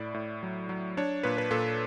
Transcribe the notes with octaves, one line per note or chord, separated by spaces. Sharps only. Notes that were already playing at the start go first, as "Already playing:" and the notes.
Already playing: A2 E4 D5
A2
F#3
F#3
D4 C#5
A#2 B4
B4
A#2 A4